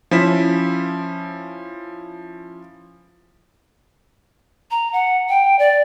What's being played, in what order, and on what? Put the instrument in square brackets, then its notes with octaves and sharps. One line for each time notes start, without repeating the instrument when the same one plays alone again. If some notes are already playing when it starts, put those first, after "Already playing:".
[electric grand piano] F3 C#4 E4 B6 E7
[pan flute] A#5
F#5
G5
D5